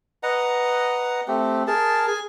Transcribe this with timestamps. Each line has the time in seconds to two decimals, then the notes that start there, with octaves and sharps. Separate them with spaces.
0.23 B4 D#5 F#5 A#5
1.28 A3 C4 G4
1.67 G#4 A#4 A5
2.07 G#4 G#5